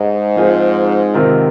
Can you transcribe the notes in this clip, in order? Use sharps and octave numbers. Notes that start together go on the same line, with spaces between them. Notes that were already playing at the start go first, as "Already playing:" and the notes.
Already playing: G#2
F3 C4 F4 G#4 C5
C3 D#3 C4 F4 A#4